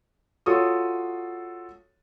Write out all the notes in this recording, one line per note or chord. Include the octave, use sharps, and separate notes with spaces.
F4 F#4 A4 C#5 D#6